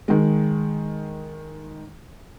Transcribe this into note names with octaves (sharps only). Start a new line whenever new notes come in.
D#3 G#3